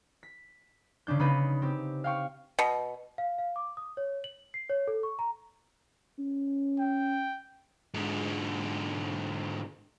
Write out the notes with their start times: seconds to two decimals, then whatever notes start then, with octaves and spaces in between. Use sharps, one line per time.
0.23 B6
1.07 C#3 C#4 D4 G6
1.19 C#3 B3 D#4 B5 G6 D#7
1.62 C4 G4
2.04 F5 G5 C#6
2.59 B2
3.18 F5
3.38 F5
3.56 D6
3.77 D#6
3.97 C#5
4.24 F#7
4.54 C7
4.70 C#5
4.87 A4
5.03 C#6
5.19 A#5
6.19 C#4
6.79 G5
7.94 G#2 D3